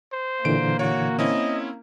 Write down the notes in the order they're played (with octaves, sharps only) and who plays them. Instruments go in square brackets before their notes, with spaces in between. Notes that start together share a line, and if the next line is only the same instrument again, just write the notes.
[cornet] C5
[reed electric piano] A#2 D3 E3 [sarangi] A#3 [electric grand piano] D7
[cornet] F#4 [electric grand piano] C#5
[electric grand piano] C4 C#4 E4 [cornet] D#5